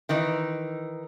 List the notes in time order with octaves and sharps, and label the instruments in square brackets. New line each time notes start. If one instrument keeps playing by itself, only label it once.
[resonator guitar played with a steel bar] D#3 E3 D#4